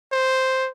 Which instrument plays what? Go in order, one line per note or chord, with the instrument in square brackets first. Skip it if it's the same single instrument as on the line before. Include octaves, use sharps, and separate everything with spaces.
[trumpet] C5